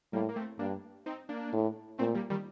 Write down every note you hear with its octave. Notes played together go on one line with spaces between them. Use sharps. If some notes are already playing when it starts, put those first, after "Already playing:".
A2 G3 A#3
A#3
A3 C4
G2 A#3 D4
C4 D#4
A#3 D4
A2
A#2 A3 C4
G3 A#3
D#3 G3